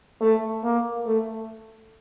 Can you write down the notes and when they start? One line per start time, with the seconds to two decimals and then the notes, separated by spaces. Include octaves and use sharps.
0.21 A3
0.63 A#3
1.06 A3